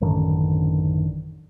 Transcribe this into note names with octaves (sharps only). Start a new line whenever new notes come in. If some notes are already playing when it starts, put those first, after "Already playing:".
A1 F#2 D3 D#3